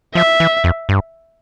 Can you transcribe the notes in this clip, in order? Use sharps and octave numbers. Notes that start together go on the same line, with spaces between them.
F3 E5
E3
F2
G2